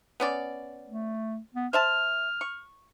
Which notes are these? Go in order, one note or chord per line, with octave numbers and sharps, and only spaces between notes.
B3 C#4 D5
A3
B3
C5 E5 A5 F6
C#6